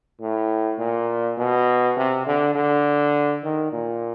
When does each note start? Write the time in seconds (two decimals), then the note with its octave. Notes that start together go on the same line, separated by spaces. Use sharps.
0.21 A2
0.79 A#2
1.37 B2
1.97 C3
2.26 D3
2.55 D3
3.43 D#3
3.72 A#2